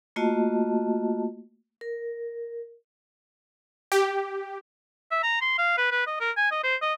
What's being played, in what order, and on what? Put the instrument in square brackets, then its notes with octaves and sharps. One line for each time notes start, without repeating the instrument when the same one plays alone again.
[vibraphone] A3 A#3 F4 F#4 D#5 A5
A#4
[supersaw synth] G4
[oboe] E5
A#5
C6
F5
B4
B4
D#5
A#4
G#5
D#5
C5
D#5